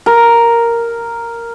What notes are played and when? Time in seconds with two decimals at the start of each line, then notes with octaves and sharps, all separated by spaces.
0.06 A#4